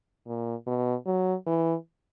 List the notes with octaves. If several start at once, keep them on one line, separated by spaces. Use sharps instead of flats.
A#2
B2
F#3
E3